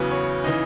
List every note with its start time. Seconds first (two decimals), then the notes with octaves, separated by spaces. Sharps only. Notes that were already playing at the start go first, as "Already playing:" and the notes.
Already playing: E2 C#3 F#3 B3
0.11 C#5
0.44 C#3 E3 D#4 D#5